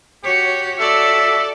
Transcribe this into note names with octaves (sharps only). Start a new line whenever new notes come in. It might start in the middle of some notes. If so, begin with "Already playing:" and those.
F#4 G4 C#5
F#4 A4 D5 E5